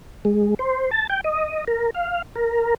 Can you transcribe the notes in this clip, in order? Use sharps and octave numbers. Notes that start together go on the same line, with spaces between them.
G#3
C5
A5
G5
D#5
A#4
F5
A#4